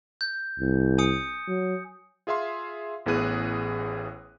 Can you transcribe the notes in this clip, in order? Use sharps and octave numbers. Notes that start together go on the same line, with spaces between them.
G6
C2
G#5 D#6 C#7
F#3
F4 G#4 E5 F5 C6
A1 A2 B3 G#4 F#6 D#7